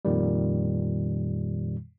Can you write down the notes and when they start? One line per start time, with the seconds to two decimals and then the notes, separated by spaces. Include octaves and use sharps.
0.05 F2 A#2 D#3 G3